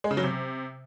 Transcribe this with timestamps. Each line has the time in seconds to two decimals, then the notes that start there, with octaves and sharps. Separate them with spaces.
0.04 G#3
0.11 C#3
0.17 F#3
0.24 C3